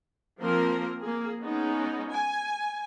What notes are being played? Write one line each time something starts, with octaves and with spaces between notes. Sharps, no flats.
F3 A#3 C4 A#4
A#3 G#4
G#3 B3 C#4 D#4
G#5